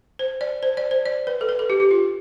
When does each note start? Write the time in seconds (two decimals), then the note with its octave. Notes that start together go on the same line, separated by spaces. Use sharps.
0.19 C5
0.41 D5
0.63 C5
0.77 D5
0.91 C5
1.06 D5
1.27 B4
1.41 A4
1.49 B4
1.59 A4
1.70 G4
1.80 G4
1.91 F4